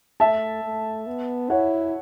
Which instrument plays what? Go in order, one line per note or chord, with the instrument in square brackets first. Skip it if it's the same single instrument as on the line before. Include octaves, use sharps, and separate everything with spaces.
[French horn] A3 [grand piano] E5 A5
[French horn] A3
B3
[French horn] E4 [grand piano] C#5 F#5